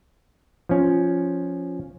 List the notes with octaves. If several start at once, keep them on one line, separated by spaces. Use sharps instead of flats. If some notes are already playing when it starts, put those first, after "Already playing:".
F3 C#4